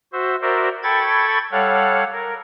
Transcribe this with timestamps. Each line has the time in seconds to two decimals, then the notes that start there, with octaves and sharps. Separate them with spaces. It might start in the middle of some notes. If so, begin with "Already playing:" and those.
0.13 F#4 C5 E5
0.42 F#4 A#4 C5 D5 E5
0.83 A4 G5 B5 C#6 G#6 A6
1.52 G3 A4 C#5 F5 F#5
2.12 A#4